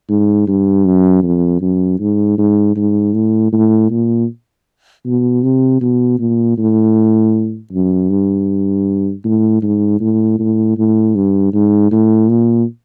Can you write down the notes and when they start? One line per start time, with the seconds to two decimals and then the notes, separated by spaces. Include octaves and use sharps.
0.09 G#2
0.47 G2
0.85 F#2
1.23 F2
1.62 F#2
2.00 G#2
2.38 G#2
2.76 G#2
3.14 A2
3.52 A2
3.91 A#2
5.06 B2
5.43 C3
5.81 B2
6.19 A#2
6.58 A2
7.73 F#2
8.10 G2
9.25 A2
9.63 G#2
10.01 A2
10.39 A2
10.78 A2
11.15 G2
11.53 G#2
11.92 A2
12.29 A#2